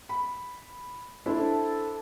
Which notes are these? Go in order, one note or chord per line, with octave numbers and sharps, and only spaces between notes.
B5
D4 E4 A4 C5